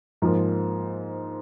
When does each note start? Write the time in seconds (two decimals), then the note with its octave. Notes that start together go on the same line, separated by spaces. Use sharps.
0.22 G#2 F3 A#3